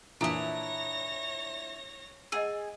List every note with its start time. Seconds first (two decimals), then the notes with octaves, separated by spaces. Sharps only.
0.21 A#2 E3 D4 E4 C#5 D#6 A#6
2.32 G#4 D#5 F#5 E6